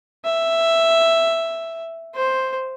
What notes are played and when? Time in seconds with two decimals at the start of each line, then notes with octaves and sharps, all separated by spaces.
0.25 E5
2.15 C5